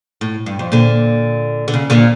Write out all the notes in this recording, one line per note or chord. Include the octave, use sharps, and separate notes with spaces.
A2
G2
F2
A#2 D3
D3
C#3
A#2 D3